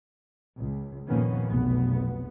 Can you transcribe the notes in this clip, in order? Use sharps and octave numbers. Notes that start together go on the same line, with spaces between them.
C#2
F2 A#2 D#3 A#3 B3 C#4
F1 B1 B2 B3